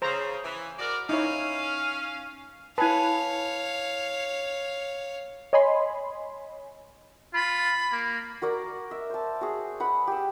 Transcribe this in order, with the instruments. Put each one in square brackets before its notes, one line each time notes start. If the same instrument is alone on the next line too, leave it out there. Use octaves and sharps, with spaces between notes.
[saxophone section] C#3 [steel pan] C5 A#5
[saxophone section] E3
F#4 A#4 D5
[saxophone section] C#4 F5 [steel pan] D#4 E4 C#5
[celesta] E4 A5 [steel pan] B4 G#5 [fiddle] C#5 F5
[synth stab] C#5 D#5 G#5 B5 C6
[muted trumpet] F4 [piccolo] B5
[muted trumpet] A#3
[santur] F#4 A#4 D5 A#5
E5
C5 A5
F#4 G#4
B4 F#5 B5
G4 E6